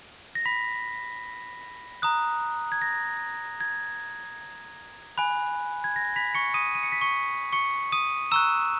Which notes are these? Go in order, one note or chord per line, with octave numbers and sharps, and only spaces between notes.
A#6
B5 B6
A#5 D#6 F#6
G#6
A#6
G#6
G#5 B5 F#6
G#6
A#6
B5 B6
C#6 C#7
D#6 D#7
D#7
C#7
B6
C#6 C#7
C#6 C#7
D#6 D#7
A#5 C#6 E6 F#6 E7